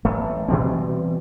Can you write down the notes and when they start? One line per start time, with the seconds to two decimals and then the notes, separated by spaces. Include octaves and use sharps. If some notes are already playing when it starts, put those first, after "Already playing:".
0.05 A1 A3
0.48 B2 E3 G3 C4